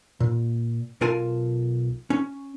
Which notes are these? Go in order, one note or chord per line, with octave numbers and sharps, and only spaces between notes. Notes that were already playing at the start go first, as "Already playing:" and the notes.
A#2
B1 F4 A#4 G#5 A5
C#4